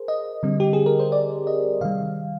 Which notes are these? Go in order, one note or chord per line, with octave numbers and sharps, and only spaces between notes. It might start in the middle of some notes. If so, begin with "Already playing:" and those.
Already playing: G#4 A#4 C5
D#5
D3 G3 C4
G4
G#4
A#4
C5
D5
D#5
C3 D#3 G3 F5